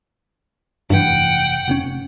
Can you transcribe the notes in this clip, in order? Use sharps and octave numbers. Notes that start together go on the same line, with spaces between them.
F1 G2 E3 F#5 G5
F1 B2 C#4